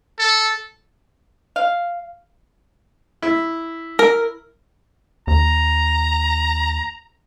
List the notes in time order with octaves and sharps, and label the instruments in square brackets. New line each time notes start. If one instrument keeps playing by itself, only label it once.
[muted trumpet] A4
[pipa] F5
[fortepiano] E4
[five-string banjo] A#4
[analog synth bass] D#2 [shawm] A#5